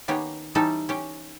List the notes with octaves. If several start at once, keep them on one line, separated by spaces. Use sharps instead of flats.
D#3 A#3 B3 C#4 G4 C#5
E3 G3 C#4 D#4 A4
C#4 G4